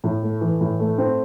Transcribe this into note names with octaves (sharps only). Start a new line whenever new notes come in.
A2
A3
E3
A2
A3
C4